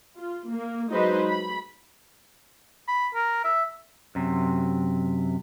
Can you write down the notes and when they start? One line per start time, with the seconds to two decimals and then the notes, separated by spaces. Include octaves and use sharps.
0.17 F4
0.50 A#3
0.91 F#3 G#3 D#4 B4 C5 D#5
1.28 B5
2.88 B5
3.14 A#4
3.44 E5
4.15 F#2 C3